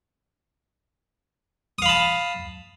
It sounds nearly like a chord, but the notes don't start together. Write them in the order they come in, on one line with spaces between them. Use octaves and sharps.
D#6 F5 B5 A5